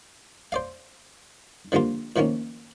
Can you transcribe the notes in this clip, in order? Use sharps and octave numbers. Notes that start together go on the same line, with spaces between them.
C5 D5 F5
D3 F3 G3 A#3 F4
A2 D#3 F3 A#3 C#4